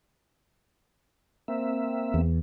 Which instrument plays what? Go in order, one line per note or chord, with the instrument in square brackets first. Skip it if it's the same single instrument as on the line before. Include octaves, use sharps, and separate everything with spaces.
[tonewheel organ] A#3 E5 [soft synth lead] C4
[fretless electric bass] E2